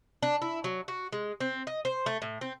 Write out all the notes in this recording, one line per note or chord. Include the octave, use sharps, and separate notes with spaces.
D4
E4
F#3
F#4
G#3
C4
D#5
C5
A3
A2
C4